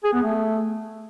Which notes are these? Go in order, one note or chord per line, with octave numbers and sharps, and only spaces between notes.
G#4
B3
A3